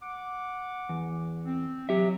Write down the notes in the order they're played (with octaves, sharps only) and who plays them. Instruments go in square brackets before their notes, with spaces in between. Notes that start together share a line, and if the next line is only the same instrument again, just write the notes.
[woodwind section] F#5 D6
[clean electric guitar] E2
[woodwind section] C4
[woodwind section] F#3 [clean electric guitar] G4 E5